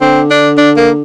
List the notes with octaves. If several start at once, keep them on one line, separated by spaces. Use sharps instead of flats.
D3 C4
D4
D4
A#3